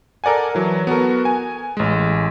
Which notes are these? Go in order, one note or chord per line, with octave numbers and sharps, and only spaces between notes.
A4 A#4 D5 F#5 G#5
E3 F#3
B3 F#4 A4 A#4
G#5
A1 G#3